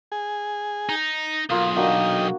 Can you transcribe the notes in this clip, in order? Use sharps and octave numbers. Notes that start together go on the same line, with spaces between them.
G#4
D#4
B1 A#3 F4 D#6
A#3 D4 D#4 F#4 D#5 G5